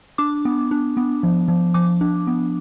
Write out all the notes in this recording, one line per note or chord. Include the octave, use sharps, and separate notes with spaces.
D4 D6
B3
D4
B3
F3
F3
F3 D6
D4
B3